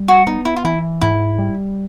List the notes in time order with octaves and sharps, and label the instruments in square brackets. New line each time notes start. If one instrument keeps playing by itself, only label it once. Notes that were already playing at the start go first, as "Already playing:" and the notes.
Already playing: [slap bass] G3
[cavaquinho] F#4
[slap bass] B3 [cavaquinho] D#4
[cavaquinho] E4
F4
[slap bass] E3 [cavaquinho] E4
[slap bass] G#2 [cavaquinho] E4
[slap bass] G3